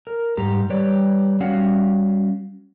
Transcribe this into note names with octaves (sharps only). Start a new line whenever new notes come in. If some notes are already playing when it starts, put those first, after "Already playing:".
A#4
G#2 G3 G4 A#5
G3 G4 B4 C#5 D5
G3 C#4 F#4 F5 F#5